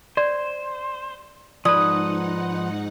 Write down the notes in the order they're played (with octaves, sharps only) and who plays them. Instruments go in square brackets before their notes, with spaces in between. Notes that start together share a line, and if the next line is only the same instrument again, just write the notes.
[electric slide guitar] C5 [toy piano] D5
[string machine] G#2 D#4 F#5 [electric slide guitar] F3 B4 [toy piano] D5 [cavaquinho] D#6